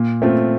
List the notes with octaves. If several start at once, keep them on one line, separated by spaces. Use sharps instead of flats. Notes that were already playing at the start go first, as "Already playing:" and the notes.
Already playing: A#2
A3 C4 F4